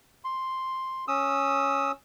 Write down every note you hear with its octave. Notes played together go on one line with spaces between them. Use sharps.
C6
C#4 D#6 E6